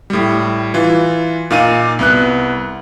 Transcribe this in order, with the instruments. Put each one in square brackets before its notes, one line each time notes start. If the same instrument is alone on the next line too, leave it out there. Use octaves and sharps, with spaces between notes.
[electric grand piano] A2 G3
E3 F4
A#2 D#4 F5 D6 D#7
C2 B3 F#6